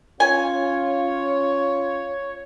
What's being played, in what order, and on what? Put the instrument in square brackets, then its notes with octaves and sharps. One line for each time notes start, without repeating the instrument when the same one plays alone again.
[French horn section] C#4 F4 [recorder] C#5 [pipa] G#5